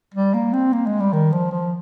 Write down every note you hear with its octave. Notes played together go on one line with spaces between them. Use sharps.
G3
A#3
C4
A#3
G#3
G3
D#3
F3
F3